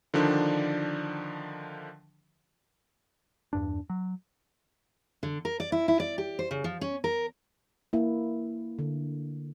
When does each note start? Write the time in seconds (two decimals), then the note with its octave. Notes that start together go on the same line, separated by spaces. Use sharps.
0.14 D3 D#3 F3 D4
3.53 E2 G2 D4
3.90 F#3
5.23 D3
5.45 A#4
5.60 D5
5.72 E4
5.88 E4
6.00 D5
6.18 G4
6.39 C5
6.51 C#3
6.64 F3
6.81 C#4
7.04 A#4
7.93 A#3 E4
8.79 D3